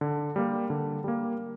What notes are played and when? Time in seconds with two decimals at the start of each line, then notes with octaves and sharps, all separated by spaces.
0.01 D3
0.36 G3 A#3
0.70 D3
1.04 G3 A#3